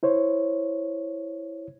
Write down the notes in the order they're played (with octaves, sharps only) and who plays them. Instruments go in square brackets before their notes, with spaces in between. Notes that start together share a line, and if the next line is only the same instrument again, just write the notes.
[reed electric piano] E4 C5 C#5